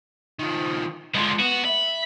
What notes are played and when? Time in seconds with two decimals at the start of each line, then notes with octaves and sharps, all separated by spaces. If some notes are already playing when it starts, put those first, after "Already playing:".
0.39 D#3 F3
1.15 D3 G#3 B3 F4
1.39 B3 F#4
1.65 E5 B5